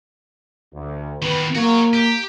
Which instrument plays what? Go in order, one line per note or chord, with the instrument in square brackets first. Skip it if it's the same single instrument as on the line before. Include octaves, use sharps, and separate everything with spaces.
[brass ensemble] D2
[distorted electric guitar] D#3 B3 [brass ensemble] B4
[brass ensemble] A#3 [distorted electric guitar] F#4 C#5
[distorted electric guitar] G4